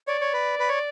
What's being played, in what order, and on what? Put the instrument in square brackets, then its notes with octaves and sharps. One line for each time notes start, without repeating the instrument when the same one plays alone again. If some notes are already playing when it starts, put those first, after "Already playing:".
[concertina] C#5 [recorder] D5
[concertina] C#5
B4
B4
C#5